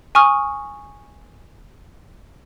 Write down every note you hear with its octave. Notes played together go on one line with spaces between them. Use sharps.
G#5 C#6 D#6 F6